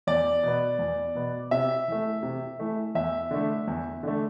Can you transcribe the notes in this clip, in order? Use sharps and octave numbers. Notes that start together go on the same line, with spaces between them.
E2 D5
B2 B3
E2
B2 B3
C3 E5
E3 A3
C3
E3 A3
E2 E5
D3 A3
E2
D3 A3